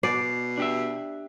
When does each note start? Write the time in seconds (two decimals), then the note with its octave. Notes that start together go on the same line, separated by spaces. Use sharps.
0.03 B2 D5 C7
0.57 D4 G4 E5